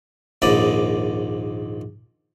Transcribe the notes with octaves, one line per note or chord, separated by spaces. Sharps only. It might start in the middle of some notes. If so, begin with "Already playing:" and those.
A#1 D#2 G#2 D5 D#5 B5